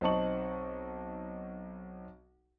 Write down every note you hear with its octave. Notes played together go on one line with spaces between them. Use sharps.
B1 C4 D#4 A5 C#6 F#7